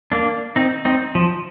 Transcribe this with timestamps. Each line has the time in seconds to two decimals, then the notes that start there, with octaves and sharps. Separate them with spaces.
0.12 A#3 D4
0.56 C4 D#4
0.85 C4 D#4
1.15 F3